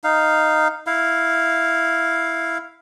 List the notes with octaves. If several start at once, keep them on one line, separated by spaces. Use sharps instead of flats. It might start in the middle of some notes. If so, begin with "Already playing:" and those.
D#4 F5
E4 F5